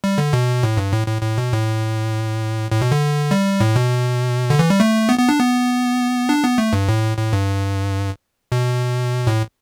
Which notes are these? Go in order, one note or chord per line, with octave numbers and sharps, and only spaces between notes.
G3
D3
B2
A2
G2
A2
A2
A2
B2
A2
A2
B2
D3
G3
A2
B2
D3
E3
G3
A3
B3
B3
D4
B3
D4
B3
A3
G2
A2
A2
G2
B2
A2